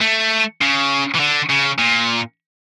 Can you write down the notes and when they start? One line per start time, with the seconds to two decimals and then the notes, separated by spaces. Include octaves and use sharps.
0.01 A3
0.61 C#3
1.15 E3
1.20 D3
1.50 C#3
1.79 A#2